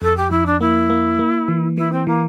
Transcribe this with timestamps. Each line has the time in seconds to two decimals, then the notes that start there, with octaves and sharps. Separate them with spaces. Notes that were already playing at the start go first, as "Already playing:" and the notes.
0.02 F2 A4
0.17 G4
0.31 F2 E4
0.46 D4
0.60 A#3 E4
0.90 A#3
1.19 A#3
1.48 E3
1.77 E3 E4
1.92 C4
2.07 E3 A#3